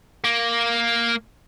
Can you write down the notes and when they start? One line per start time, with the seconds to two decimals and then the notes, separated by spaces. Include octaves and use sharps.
0.25 A#3